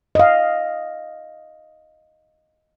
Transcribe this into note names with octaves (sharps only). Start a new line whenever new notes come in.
D#5 F5